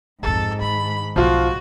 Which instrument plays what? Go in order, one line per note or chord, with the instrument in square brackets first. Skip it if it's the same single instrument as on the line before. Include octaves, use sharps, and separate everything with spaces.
[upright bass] A#1 F2 [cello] G#2 [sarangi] A4
[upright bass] D#3 [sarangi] B5
[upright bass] B1 [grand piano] F3 F4 [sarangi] F#4